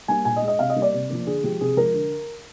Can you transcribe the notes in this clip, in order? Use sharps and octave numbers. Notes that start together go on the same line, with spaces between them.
G3 A#3 G#5
A#2 G#5
D#5
G#3
D#5
C3 F5
D#5
G3 A#3
D5
C3
F3 A#3
D3 G#4
F3 G#3 G4
C3 G#4
F3 G#3 A#4
D3